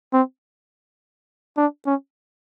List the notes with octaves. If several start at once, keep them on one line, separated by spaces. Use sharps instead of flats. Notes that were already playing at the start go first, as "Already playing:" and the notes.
C4
D4
C#4